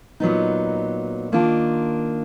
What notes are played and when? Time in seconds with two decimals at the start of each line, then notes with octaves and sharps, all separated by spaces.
0.20 A#2 F#3 B3 D#4
1.32 D#3 A#3 D4 F4